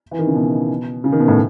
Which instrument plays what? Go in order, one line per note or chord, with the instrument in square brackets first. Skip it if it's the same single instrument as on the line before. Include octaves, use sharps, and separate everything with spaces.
[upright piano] E3
D#3
C#3
B2
C#3
D#3
B2
A2